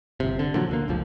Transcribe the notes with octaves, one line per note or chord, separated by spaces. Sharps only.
G1 C3
D3
A#2 D3 F3 F#3
D2 D3 A#3
F#1 C#2 F3